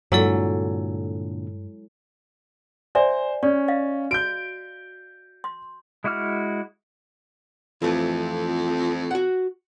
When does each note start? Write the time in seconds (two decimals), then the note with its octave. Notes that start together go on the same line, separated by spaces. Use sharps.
0.12 G2 A#2 D3 F#3 G#3 E4 A4
2.95 C5 D5 E5 G#5
3.43 C#4 D5
3.68 D#5 F5
4.11 F#4 G6 D7
5.44 C6
6.04 G#3 E4 F#4 D6 F6
7.82 F2 E3 A3
9.11 F#4 F#5